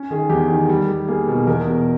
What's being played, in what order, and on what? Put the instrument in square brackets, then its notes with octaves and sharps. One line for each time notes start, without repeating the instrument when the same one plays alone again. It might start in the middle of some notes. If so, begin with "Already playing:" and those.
Already playing: [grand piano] C#4
D#3 G#4
E2 G4
D#3
G3
G3
A#3 G#4
B2
E2 A#4
B2